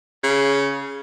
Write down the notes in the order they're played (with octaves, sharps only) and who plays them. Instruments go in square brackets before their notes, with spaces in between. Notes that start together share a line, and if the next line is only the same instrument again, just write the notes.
[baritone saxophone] C#3